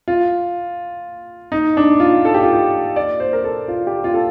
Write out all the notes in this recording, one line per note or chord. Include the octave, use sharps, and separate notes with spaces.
F4
D#4
D4
F4
A4
G4
F4
G4
D5
C5
A#4
A4
F4
G4
F4
A4